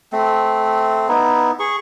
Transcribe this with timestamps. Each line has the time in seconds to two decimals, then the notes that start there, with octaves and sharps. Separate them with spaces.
0.13 A3 C4
1.08 B3 D#4 E4
1.59 G#4 C#6